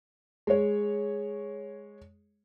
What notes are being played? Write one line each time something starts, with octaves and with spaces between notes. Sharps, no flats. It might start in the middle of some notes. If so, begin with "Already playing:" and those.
G#3 C#5